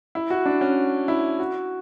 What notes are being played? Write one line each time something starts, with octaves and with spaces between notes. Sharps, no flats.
E4
F#4
D4
C#4
E4
F#4